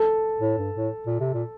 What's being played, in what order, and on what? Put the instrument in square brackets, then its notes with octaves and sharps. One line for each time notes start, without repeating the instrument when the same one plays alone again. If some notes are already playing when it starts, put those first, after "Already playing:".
Already playing: [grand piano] A4
[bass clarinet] A2
G2
A2
A#2
C3
A#2